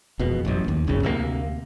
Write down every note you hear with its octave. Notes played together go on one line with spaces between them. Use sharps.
E1 F2 B2
A1 F#2
D#2
G1 C2 F#2 C#3
D2 C3 F3 A#3